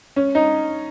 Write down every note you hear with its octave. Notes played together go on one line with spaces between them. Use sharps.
C#4
D#4